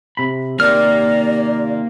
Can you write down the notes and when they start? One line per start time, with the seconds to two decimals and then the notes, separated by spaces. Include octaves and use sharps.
0.17 C3 B5
0.60 D#2 C3 A#3 D5 F6